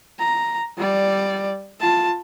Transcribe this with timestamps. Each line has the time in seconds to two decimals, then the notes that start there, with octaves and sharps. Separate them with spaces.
0.19 A#5
0.78 G3 D5
1.81 F4 A5